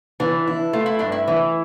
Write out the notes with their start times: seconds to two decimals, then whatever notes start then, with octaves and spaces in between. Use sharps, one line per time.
0.20 E3 D4
0.47 E4
0.73 A3 F4
0.86 E4
0.99 G2 D4
1.12 E4
1.28 E3